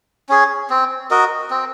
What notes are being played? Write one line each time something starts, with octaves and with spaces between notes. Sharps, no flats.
C#4 G#4
C4
F#4 A#4 D#5
C4